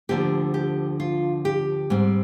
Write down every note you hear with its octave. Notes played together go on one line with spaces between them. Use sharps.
D2 D3 F3 A#3 G4
G4
F4
G4
G#2 G3 C4